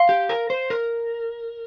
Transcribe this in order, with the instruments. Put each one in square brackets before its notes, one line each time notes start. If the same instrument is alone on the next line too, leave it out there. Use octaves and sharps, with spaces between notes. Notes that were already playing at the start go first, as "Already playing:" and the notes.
Already playing: [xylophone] F5 C6
[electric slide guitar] G4
A#4
C5
A#4